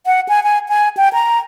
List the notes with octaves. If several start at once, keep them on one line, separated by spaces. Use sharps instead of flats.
F#5
G#5
G#5
G#5
G5
A#5